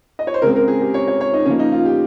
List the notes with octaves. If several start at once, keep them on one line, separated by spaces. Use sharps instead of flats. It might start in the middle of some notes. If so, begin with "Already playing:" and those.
D#5
C#5
C5
C#3 G#3 C4 A#4
A#4
G#4
G4
C#5
C#5
C#5
D#4
C#3 F3 A#3 C#4
D#4
F4
G4